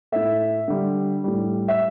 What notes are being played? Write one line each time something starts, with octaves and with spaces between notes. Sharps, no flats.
A2 A3 E5
D3 G3
A2 G3
E5